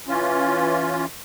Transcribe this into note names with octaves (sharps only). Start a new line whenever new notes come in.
E3 C#4 F4